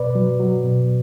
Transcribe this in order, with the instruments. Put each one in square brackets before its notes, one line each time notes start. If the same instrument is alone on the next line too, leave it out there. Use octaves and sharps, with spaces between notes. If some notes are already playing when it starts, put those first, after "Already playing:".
Already playing: [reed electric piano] B2 B4 D5
F#3
F#3
B2